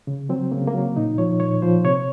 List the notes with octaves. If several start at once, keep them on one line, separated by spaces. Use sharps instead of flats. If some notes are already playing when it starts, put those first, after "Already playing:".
C#3
F#3 C4
C#3 A#3
A#3
F#3
A#2 D#4
F3 C#5
A#2 C#5
F3 C5
C3 C#5